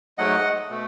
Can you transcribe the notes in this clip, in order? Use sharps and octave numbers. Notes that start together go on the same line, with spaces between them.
G#2 F#3 A3 D#5 F#5
B2 A3